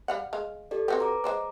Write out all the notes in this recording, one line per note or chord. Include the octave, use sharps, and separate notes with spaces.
G3 F5 F#5
G#3 F5
G4 A4 D5
C4 F#4 G4 B4
A#5 D6
G#3 C5 D5